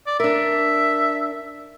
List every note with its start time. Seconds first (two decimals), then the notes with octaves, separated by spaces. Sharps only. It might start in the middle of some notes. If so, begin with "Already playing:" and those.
0.07 D5
0.20 D4 A#4 E5